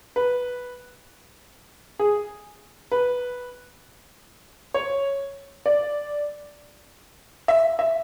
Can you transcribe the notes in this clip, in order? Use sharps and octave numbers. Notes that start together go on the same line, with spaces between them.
B4
G#4
B4
C#5
D5
E5
E5